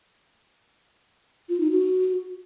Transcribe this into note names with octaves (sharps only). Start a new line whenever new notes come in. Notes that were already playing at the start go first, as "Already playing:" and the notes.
F4
D#4
F#4